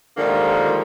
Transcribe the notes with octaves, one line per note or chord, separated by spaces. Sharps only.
D3 D#3 F3 G3 G#3 A#3